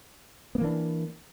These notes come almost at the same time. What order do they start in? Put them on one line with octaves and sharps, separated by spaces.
B3 A#3 E3 D4